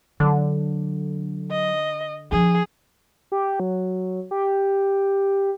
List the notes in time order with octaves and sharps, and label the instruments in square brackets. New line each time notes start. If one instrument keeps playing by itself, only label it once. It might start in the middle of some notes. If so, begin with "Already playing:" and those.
[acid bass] D3 [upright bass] F#3
[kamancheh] D#5
[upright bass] F3 D4 [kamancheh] G#4
[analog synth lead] G4
F#3
G4